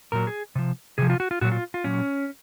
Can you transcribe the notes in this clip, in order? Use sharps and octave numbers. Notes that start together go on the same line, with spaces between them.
A#2 F#3 A#4
G#4
C3 F3
C3 F3 G#4
F4
F#4
F4
A#2 F#3 F#4
F4
F4
A#2 F#3 C#4